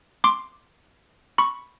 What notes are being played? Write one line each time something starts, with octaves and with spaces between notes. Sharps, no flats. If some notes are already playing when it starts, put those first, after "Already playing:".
C6 D6
B5 C#6